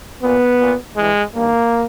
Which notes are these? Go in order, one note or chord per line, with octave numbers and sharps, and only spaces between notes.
A#2 B3
A#2
G2 E3 G#3
G2 D#3 A#3